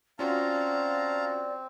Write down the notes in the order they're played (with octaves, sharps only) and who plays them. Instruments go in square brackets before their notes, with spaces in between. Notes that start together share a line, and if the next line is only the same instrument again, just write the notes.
[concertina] C4 [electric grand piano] C#4 F4 F#4 [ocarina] D5 [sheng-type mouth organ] F5 A5 A#5